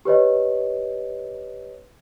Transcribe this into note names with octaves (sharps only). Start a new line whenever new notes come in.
G4 B4 C#5 D#5